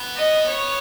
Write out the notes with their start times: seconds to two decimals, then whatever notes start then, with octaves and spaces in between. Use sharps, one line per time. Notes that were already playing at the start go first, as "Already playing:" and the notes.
Already playing: B3
0.16 D#5
0.48 C#5